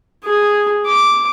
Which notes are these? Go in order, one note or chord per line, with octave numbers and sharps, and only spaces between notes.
G#4
D6